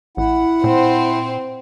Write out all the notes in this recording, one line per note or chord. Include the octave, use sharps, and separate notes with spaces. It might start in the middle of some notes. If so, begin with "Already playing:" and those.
A1 E4 F#5
A#2 C4 C5